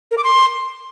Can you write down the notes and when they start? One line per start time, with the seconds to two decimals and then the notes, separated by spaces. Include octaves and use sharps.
0.11 A#4
0.17 D6
0.24 C6